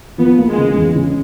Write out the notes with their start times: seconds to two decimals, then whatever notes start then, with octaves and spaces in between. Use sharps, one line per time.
0.18 F3 B3
0.38 A#3
0.48 G#3
0.58 C#3
0.76 E2
0.95 C#3